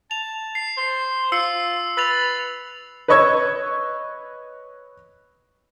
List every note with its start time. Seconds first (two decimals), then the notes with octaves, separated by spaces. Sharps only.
0.11 A5 F7
0.55 C7
0.77 C5
1.32 F4 E6 C7 C#7
1.97 B4 E6 A6 F7
3.08 B4 C#5 D#5 C#6 E6 G#6